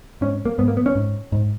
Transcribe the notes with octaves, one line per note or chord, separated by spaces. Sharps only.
G#2 C#4
A#3
G#2 B3
A#3
B3
C#4
G#2
G#2